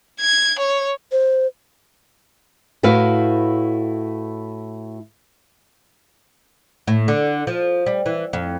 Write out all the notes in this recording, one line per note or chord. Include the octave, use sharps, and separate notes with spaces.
G#6
C#5
C5
A2 E4 F#4 B4 F5
A2
D3
F3
G3
E3
F2